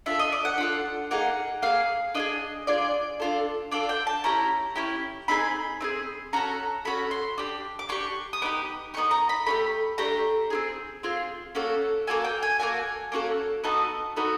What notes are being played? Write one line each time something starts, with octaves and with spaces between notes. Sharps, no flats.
D4 F4 A4 E5
D#5
D5
F#5
D4 F4 A4
A#3 D#4 G#4 F#5
A#3 D#4 G#4 F5
D4 F4 G#4 D#5
D4 F4 G#4 D5
D4 F4 A4
D4 F4 A4 D5
G5
A5
C#4 E4 G4 A#5
C#4 E4 G4
C4 D#4 G#4 B5
C4 D#4 G#4
C#4 F#4 A4 A#5
C#4 F#4 A4 B5
C6
D4 G4
D6
D4 G4 C#6
D#6
B3 D#4 G4 D6
B3 D#4 G4 C#6
A#5
B5
A3 D4 G4 B5
A3 D4 G4 A#5
C4 F4 G#4
C4 F4 G#4
A#3 C#4 F#4 A4
A#3 C#4 F#4 A4 G#5
G5
G#5
A#3 C#4 F#4 A4 G#5
A#3 C#4 F#4 A4
B3 D#4 F#4 A4 A5
B3 D#4 F#4 A4